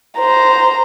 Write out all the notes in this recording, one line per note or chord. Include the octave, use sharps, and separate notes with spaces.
C5 A#5